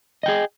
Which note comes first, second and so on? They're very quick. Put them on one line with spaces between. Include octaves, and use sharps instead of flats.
D#5 G5 G#4